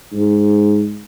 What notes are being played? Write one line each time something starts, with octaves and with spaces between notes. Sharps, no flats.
G#2